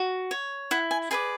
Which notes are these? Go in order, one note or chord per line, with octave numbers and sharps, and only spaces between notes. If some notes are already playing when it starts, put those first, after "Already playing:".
Already playing: F#4
C#5
E4 F#5
G#5
G#4 B4 D5 G#5